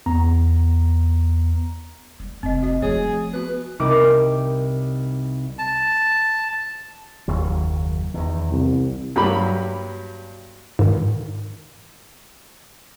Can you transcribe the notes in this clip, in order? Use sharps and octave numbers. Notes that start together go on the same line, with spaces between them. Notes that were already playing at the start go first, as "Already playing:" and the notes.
E2 B3 A#5
G3
F1 C4 D#5
F#4 D#5
F3 A3 G#4 C#5
B3 F#4 B4
C2 G3 D#4 A#4 D6 D7
A5
F#1 D#2 F#3
E2 D#3
C2
G2 F#3 A#3 G4 B5
G#2 D#3